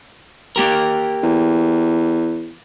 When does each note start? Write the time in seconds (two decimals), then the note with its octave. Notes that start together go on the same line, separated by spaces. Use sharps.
0.56 A#3 G4 A#4
1.23 E2